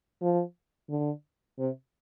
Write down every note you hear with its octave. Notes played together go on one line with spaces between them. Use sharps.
F3
D3
C3